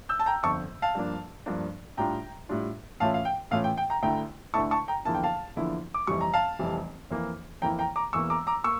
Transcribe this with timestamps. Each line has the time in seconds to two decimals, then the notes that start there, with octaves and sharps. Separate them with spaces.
0.09 E6 G6
0.19 A5
0.26 G5 A#5
0.43 G1 F2 D3 A5 C#6
0.82 F5 A5
0.95 G2 F3 A#3 D4
1.46 G2 F3 A#3 D4
1.97 A2 G3 D4 F4 G5 A#5
2.49 A2 G3 D4 F4
3.00 A2 E3 A3 C#4 F4 F5 A5
3.14 F5
3.25 G5
3.51 A2 E3 A3 C#4 F4 F5
3.64 G5
3.77 G5
3.90 G5 A#5
4.02 D2 D3 A3 E4 G5 A#5
4.54 D2 D3 A3 E4 A5 C#6
4.71 A5 C#6
4.88 G5 A#5
5.05 E2 D3 F3 A#3 E4 A5
5.14 G5
5.23 F5 A5
5.56 E2 D3 F3 A#3 E4
5.94 D6
6.07 F1 F2 E3 G3 C#6
6.21 A#5
6.33 F5 A5
6.59 F1 F2 E3 G3
7.11 F2 E3 A#3 E4
7.62 F2 E3 A#3 E4 G5 A#5
7.79 G5 A#5
7.96 A#5 D6
8.13 E1 E2 E3 A#3 C#6 E6
8.30 A#5 D6
8.47 A#5 D6
8.64 A#3 C#6 E6